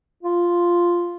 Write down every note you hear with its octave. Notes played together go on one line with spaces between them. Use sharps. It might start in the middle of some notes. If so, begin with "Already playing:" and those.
F4